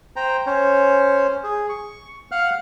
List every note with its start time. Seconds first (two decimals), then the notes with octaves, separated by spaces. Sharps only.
0.16 C5 G5 A#5
0.46 C#4 C5 C#5
1.44 G#4
1.69 C#6
2.32 F5 F#5 F6 F#6